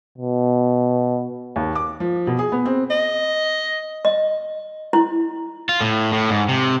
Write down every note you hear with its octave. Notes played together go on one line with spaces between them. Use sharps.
B2
D#2
D6
F3
B2
G#4
B3
C4
D#5
D#5
E4
F4
A2
A2
G#2
C3